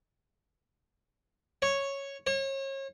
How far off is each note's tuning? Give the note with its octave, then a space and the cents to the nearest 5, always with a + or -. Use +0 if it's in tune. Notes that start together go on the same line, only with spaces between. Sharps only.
C#5 -5
C#5 -35